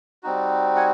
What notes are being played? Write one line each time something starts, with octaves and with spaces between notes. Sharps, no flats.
G3 C4 D#4 F#4
F#5 G#5